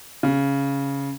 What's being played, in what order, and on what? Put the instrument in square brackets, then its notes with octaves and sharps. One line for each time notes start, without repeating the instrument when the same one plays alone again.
[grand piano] C#3